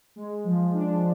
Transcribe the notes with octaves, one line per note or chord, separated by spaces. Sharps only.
G#3
F3
D4